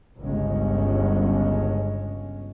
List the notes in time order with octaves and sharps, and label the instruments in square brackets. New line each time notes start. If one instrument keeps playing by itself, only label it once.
[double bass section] G1 C#2 G#3 C#4